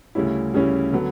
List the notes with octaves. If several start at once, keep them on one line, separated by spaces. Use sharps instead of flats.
D2 C#3 G3 C#4 E4
D2 C#3 G3 C#4 E4
D3 F#3 B3